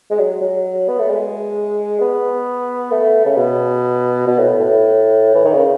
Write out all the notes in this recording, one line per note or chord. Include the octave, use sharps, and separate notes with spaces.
G#3
F#3
F#3
B3
A3
G#3
B3
A3
C#3
B2
B2
A2
A2
E3
D#3
C#3